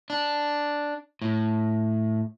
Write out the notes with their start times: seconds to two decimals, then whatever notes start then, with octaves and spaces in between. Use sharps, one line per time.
0.10 D4
1.22 A2